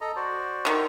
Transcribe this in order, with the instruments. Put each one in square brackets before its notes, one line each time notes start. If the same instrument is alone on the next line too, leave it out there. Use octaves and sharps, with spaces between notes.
[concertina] A4 D#5 A#5
F#4 C5 D5
[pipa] D3 D#3